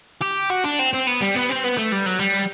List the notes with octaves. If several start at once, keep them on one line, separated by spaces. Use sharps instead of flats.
G4
F#4
D4
C4
C4
B3
G3
B3
C4
B3
A3
G3
F#3
G3